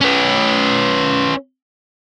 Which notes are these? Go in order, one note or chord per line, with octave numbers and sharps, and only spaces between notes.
C#4 B4